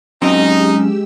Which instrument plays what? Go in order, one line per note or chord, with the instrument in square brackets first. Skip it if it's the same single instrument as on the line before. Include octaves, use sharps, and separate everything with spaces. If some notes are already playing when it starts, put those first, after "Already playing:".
[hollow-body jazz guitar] F#3 C4 G5 [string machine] G#3 G4 E6 [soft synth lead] C#4 [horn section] D#4